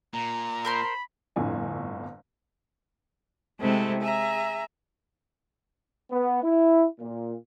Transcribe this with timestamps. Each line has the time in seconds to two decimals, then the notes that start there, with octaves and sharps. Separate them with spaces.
0.13 A#2 A#5
0.65 A#4 C5 B5 C6
1.36 G1 F2 A2 D3 D4 G#5
3.60 C3 G#3 A3 C4 E4
4.01 G#4 E5 A#5
6.11 B3
6.43 E4
7.00 A#2